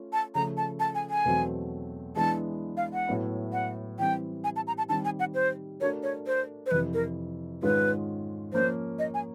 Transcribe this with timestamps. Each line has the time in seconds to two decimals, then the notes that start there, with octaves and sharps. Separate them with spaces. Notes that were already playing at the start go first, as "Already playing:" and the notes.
Already playing: A3 C#4 F4
0.13 A5
0.35 C#3 F3 A3 A#5
0.57 A5
0.80 A5
0.95 G#5
1.10 G#5
1.25 E2 B2 F#3 A3 C4
2.16 E3 G#3 B3 D4 A5
2.77 F5
2.93 F#5
3.07 A2 F#3 B3 E4
3.53 F#5
3.99 E3 G3 C4 G5
4.44 G#5
4.56 A5
4.67 A#5
4.78 A5
4.89 D#3 G3 C4 A5
5.05 G#5
5.20 F#5
5.35 C5
5.81 A3 D4 F#4 A#4 C#5
6.03 C#5
6.27 C5
6.66 C5
6.71 F2 C3 E3 B4
6.94 A#4
7.63 G#2 D#3 G#3 C#4 F4 B4
8.53 F3 A#3 C#4 C5
8.99 D#5
9.14 G#5